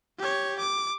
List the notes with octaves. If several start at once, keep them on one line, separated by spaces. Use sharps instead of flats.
G4 C#5
D6